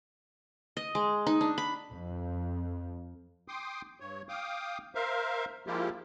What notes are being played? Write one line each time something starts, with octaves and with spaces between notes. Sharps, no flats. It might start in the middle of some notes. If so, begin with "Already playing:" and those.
D#5
G#3
D#4
D4
B5
F2
G5 C6 D6 D#6
G2 C#5
F5 G5 D6 D#6
A#4 C5 E5 F5
F3 G#3 A#3 E4 F4 G4